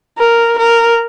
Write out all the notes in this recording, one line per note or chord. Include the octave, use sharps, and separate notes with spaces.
A#4
A#4